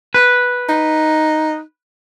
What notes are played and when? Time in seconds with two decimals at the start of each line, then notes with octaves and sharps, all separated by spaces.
0.14 B4
0.69 D#4